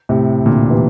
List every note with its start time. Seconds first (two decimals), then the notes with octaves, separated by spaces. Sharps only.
0.09 A2 C3
0.46 A#2 D3
0.70 C3 E3